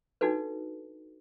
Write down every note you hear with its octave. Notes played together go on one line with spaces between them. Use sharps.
D4 D#4 F#4 A4 B4